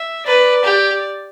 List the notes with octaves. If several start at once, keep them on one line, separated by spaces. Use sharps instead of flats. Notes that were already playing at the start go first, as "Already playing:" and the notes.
Already playing: E5
B4 D5
G4